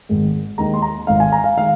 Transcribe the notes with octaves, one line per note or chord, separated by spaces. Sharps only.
G#1 G#2 D#3 G#3
D#2 D#3 G#3 A#5
C6
A#5
G#1 G#2 G#3 F5
G#5
A#5
F5
D#3 G#3 F5